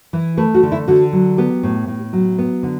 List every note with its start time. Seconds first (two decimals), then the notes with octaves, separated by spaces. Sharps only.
0.13 E3
0.37 A3 B4
0.54 F#4
0.63 D3
0.72 E4
0.88 D3 F#4
1.13 F#3
1.38 B3 G4
1.63 A2
1.88 A2
2.13 F#3
2.38 B3
2.63 D3